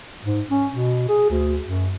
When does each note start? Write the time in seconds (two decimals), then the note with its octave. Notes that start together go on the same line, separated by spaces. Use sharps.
0.23 G#2
0.50 C#4
0.72 B2
1.08 G#4
1.30 D2
1.63 F#2